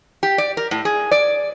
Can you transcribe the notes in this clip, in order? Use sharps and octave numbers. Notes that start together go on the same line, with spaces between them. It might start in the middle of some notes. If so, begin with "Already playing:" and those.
G4
D5
A#4
A2
G#4
D5